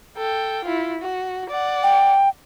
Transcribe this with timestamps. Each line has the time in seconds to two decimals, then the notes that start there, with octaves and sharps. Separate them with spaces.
0.17 A4 G5
0.65 E4 F4
1.01 F#4
1.49 D5 F#5
1.83 G5